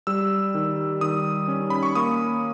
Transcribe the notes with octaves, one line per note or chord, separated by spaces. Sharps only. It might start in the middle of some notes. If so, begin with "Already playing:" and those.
G3 E6
D#3
D#3 D#6
C#4
B5
C#6
A#3 D#6